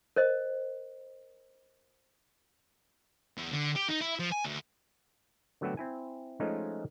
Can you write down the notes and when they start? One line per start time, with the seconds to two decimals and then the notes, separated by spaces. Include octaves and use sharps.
0.16 A#4 C5 D#5
3.37 E2
3.52 D3
3.75 G4
3.89 D#4
4.01 E4
4.19 F3
4.32 G#5
4.44 D2
5.61 D3 F#3 A3 B3 F#4 G5
5.77 C4 E4 G#5
6.40 F3 G#3 A3 C#4 D#4 F4